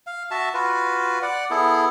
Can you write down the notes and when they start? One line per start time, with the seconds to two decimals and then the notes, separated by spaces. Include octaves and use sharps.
0.07 F5
0.31 F#4 E5 A5
0.54 F4 F#4 B4
1.22 D5 F#5
1.51 B3 E4 G#4 A4